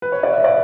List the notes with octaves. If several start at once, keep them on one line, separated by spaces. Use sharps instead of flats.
B4
C#5
D5
E5
D5